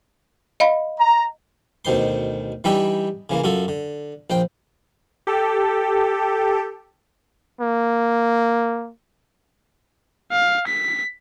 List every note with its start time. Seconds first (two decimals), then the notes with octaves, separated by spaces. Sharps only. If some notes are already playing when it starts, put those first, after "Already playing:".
0.60 D#5 F5 B5
1.00 A#5
1.85 D2 B2 D#3 C5 C6
2.64 E3 G3 D4 D#4 E5 G5
3.30 C#3 E3 A#3
3.44 F#2 F4 F#4 A4
3.68 D3
4.30 A#1 C5 G5
5.27 G4 A4
7.61 A#3
10.32 F5
10.67 B6